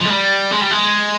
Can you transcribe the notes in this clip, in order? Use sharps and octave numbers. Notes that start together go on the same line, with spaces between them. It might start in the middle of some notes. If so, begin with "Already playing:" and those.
F3
G#3
G3
G#3
G3
G#3